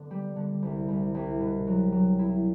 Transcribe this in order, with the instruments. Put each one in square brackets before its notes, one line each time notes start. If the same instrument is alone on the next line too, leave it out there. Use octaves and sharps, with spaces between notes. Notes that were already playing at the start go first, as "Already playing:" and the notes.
Already playing: [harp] D3 B3
G3
D3
C2
C2
C2
B2
F#3
F#3
E4